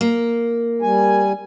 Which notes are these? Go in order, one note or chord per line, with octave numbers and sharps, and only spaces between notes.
A#3
G3 G#5